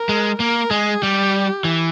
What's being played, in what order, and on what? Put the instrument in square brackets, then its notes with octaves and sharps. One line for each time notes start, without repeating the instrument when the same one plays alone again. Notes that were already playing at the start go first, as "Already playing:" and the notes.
Already playing: [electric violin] A#4
[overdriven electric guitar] G#3
[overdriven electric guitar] A#3 [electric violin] A#4
[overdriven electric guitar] G#3 [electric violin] G#4
[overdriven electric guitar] G3 [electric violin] G4
[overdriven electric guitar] E3